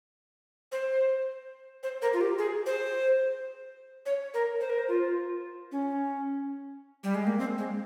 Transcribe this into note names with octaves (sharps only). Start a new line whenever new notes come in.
C5
C5
A#4
F4
G4
G#4
C5
C#5
A#4
C5
A#4
C5
F4
C#4
G3
G#3
A#3
C4
G#3